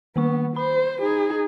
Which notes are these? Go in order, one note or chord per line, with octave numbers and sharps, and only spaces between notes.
D#3 A#3 B3 C#6
C5 B5
D#4 G#4